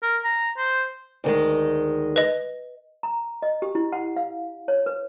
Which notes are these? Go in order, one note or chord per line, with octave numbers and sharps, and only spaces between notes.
A#4
A#5
C5
D2 D#3 G#3
B4 D#5
A#5
D#5
G4
E4
F#5
F5
C#5
B4